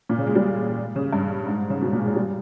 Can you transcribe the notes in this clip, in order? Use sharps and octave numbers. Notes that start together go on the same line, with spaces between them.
A#2
C#3
G#3
G3
C#3
G2
G#2
C#3
B2
A#2
G#3
G3